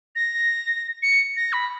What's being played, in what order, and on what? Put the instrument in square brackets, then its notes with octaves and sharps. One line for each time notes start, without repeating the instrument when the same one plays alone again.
[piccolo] A#6
C#7
A#6
B5